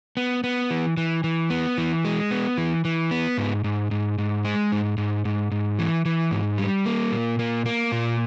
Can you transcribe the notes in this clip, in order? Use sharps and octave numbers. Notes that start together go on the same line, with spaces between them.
B3
B3
E3
E3
E3
B3
E3
G#3
B3
E3
E3
B3
G#2
G#2
G#2
G#2
G#3
G#2
G#2
G#2
G#2
E3
E3
G#2
G3
A#3
A#2
A#3
A#3
A#2